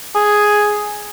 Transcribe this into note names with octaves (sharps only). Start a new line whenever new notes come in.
G#4